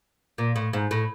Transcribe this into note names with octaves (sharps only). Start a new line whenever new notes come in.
A#2
A2
G#2
A2